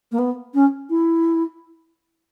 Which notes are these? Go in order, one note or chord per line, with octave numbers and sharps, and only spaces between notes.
A#3
B3
C#4
E4